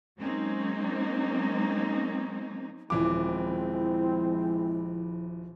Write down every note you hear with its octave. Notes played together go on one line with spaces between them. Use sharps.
F#3 G#3 A#3 C4 C#4 D#4
D#1 E3 F3 G#3 C4 E4 D6